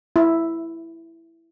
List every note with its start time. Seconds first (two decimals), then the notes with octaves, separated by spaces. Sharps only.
0.16 E4